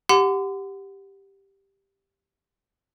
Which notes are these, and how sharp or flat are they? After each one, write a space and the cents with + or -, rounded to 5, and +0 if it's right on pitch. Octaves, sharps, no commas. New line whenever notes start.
G4 +0 F#5 +0 C6 -40